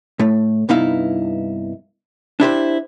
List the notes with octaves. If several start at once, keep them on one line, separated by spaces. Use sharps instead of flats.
A2 A3
C2 G2 B3 D#4 E4 F5
D4 E4 G4 C5